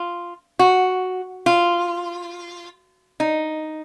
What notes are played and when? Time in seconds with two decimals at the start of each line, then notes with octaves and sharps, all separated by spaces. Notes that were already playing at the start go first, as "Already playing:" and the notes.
Already playing: F4
0.59 F#4
1.46 F4
3.20 D#4